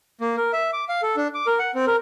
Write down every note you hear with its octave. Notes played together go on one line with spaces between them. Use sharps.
A#3
A#4
E5
D6
F5
A4
D4
D6
A#4
F#5
C4
A#4